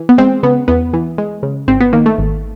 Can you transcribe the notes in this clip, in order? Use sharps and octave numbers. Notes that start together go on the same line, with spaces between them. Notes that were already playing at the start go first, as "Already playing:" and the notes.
Already playing: E3
B3
G#3 C4
C#3 B3
E2 B3
E3
G#3
C#3
G#1 C4
B3
D#3 A#3
A3
G#1